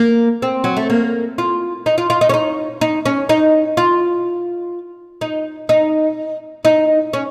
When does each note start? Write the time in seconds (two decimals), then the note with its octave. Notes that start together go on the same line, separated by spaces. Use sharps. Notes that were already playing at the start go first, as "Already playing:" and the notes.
Already playing: A#3
0.42 C4
0.64 F#3
0.77 A3
0.90 A#3
1.38 F4
1.86 D#4
1.98 F4
2.10 F4
2.21 D#4
2.29 C#4
2.34 D#4
2.81 D#4
3.06 C#4
3.29 D#4
3.77 F4
5.21 D#4
5.69 D#4
6.65 D#4
7.13 C#4